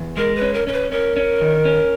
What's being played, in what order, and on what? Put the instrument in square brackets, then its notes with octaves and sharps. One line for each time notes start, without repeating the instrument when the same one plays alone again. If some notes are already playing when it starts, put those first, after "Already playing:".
Already playing: [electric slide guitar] E2
[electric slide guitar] G#3 [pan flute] A#4
[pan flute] B4
[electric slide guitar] C#4
[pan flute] A#4
[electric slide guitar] C#4 [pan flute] A#4
[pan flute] B4
[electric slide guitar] C#4 [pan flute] A#4
[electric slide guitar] C#4
D#3
C#4